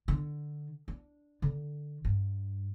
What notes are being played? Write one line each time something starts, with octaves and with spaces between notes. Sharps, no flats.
D3
D4
D3
G2